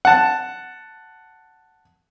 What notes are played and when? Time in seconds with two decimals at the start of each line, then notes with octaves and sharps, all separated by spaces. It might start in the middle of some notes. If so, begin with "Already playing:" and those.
0.05 F#5 A5